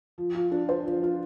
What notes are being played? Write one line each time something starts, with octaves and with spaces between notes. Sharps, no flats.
F3
F4
D4
C5
F3
F4